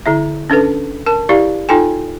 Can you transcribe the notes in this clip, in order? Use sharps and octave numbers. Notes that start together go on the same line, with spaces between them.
D3 E4 E5
C#4 D4 A4 B4
A#4 A5
E4 G4 D5 F5
D#4 F4 A4 G5 G#5